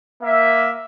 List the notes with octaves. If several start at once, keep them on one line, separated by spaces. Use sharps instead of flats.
A#3 E5